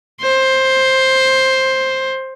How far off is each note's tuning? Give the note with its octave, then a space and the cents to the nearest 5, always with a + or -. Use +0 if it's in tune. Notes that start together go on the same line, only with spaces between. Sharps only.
C5 +10